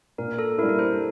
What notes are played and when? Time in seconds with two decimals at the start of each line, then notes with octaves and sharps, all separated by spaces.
0.18 A#2 A#4
0.39 A4
0.58 G3 A#3 E4 A#4
0.69 A#4
0.79 A4 C5